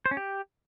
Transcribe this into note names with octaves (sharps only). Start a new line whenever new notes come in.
C5
C#4
G4